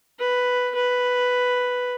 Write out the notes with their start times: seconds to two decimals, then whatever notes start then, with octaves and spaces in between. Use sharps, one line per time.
0.19 B4
0.75 B4